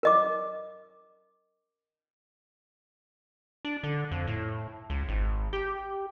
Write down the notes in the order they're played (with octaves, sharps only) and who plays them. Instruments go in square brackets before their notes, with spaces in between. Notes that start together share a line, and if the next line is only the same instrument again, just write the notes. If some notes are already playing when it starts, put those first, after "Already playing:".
[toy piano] A#4 D#5 D6
[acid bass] D4
D3
F2
A2
C#2
G#1
G4